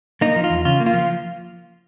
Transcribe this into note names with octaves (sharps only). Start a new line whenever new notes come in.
A#3 D#4
F3
F4
E2
C#3 F4
A#3
F4
F3